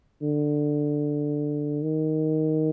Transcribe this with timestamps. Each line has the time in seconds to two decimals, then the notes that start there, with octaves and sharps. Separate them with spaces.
0.22 D3
1.82 D#3